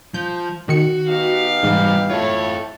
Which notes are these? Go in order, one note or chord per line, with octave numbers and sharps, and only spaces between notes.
F3 G6
D#3 F#4 C#7
B3 D#4 G4 F5
G#2 E3 G3
A2 E4 F4 A4 C#5